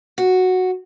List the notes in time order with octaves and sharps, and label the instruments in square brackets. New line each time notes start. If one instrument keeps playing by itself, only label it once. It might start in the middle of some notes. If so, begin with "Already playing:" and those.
[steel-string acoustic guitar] F#4